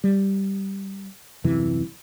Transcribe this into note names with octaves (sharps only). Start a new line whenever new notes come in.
G3
D#1 F#2 C3 E3